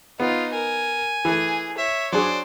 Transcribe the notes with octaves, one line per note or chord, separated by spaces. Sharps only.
B3 D#4 F4
A#4 G#5
E3 A3 G#4
C#5 E5
F#3 D4 G#4 C5 D5